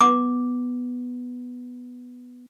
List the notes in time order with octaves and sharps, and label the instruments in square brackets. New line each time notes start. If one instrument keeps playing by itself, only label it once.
[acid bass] B3 [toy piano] D6